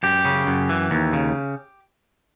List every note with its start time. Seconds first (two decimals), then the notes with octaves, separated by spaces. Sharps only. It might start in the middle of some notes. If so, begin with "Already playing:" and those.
0.03 F#2 G4
0.25 C#3
0.47 F#2
0.69 E3
0.91 D#2
1.13 C#3